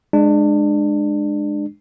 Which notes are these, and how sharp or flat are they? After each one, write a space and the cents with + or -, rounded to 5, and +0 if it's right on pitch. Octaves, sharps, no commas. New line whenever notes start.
G#3 +0 D4 +25